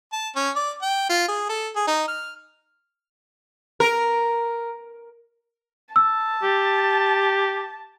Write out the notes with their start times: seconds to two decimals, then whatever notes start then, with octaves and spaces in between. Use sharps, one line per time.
0.13 A5
0.36 C#4
0.56 D5
0.82 G5
1.10 F4
1.28 G#4
1.49 A4
1.76 G#4
1.88 D#4
2.08 F6
3.80 A#4
5.96 A5 E6
6.43 G4